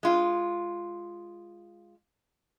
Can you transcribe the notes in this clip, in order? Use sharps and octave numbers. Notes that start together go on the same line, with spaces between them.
G#3 F4